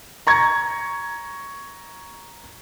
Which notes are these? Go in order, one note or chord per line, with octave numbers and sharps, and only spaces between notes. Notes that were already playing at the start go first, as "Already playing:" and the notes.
A#5 C#6 G#6